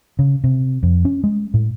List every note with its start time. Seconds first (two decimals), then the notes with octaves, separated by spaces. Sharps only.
0.19 C#3
0.44 C3
0.83 F2
1.05 C#4
1.24 G#3
1.54 A2